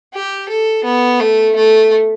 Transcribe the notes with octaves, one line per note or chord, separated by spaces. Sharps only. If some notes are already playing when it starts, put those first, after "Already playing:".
G4
A4
B3
A3
A3